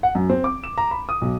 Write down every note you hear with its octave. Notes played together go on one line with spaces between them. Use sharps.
F#5
F#2
C4
D6
E7
A#5
B5
D#6
B1